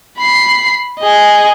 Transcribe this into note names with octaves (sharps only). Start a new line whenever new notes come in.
B5 C7
G#4 D#5